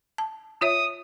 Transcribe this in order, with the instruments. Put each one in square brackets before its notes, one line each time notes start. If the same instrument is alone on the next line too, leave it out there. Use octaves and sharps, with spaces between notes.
[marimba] A5
[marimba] F4 C#5 E5 [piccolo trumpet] D#6